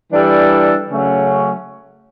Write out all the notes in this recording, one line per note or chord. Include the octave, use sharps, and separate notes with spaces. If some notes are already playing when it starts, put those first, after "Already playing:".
E3 G3 D4 A4
C#3 F#3 A3 C#4